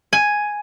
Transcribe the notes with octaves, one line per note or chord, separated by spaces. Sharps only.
G#5